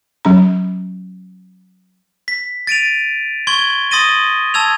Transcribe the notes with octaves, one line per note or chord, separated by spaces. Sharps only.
F#3 C#4 A#5
B6
A6 D7 D#7 F7
C6 C#6 G#6 G7
C6 D#6 A6 A#6 D#7 G7
A5 E6 G#6 F7